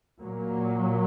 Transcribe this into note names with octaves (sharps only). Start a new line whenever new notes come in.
A#2 F#3 A#3